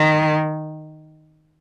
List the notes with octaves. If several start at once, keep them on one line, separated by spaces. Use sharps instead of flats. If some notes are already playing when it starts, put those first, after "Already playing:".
Already playing: D#3